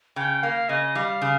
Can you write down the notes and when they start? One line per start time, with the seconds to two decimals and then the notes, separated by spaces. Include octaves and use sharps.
0.16 C#3 G5
0.43 A#3 F5
0.69 C#3 D#5
0.95 G3 F5
1.22 C#3